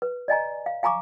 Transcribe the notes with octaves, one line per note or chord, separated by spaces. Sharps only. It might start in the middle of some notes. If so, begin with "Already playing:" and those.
B4
D5 D#5 G#5 A#5
F5
F5 G#5 A#5 C#6 D6